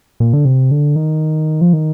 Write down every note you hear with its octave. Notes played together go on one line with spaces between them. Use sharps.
A#2
D3
C3
D3
D#3
F3
D#3